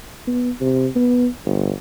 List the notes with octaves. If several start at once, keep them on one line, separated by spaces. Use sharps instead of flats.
B3
C3
B3
G1